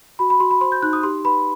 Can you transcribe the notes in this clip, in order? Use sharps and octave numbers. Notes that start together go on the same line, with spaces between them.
F#4 B5
B5
F#4 C6
B5
C5 C6
G6
D#4 F#6
D#6
G4 C6
B4 B5